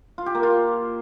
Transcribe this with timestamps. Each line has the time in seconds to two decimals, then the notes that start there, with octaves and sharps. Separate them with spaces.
0.18 F4
0.26 G4
0.35 A#3
0.43 F4